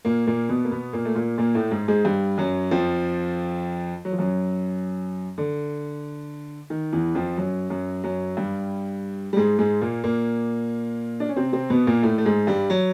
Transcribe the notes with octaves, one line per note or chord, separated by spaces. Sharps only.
A#2 A#3
A#2 A#3
B2 B3
A#3
B2 B3
A#2 A#3
A3
A#2 A#3
A#2 A#3
A2 A3
G#2 G#3
G#2 G#3
G2 G3
F#2 F#3
F2 F3
F#3
F3
F#2 F#3
D3
D#3
E2 E3
F2 F3
F#2 F#3
F#2 F#3
F#2 F#3
G2 G3
G3
G#2 G#3
G#2 G#3
A#2 A#3
A#2 A#3
D4
C#4
C3 C4
C3 C4
B2 B3
A#2 A#3
A2 A3
A3
G#2 G#3
G2 G3
F#3